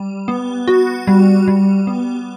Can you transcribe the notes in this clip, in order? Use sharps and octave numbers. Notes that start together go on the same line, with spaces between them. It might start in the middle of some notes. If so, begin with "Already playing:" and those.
Already playing: G3
B3
F#4
G3
G3
B3